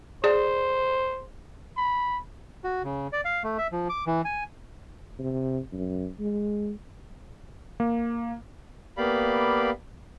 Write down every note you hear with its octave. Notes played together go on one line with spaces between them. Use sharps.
G#4 C5 D5
B5
F#4
C#3
D5
F5
A3
E5
F3
D6
E3
G#5
C3
F#2
G#3
A#3
A#3 B3 G4 D5 F5 B5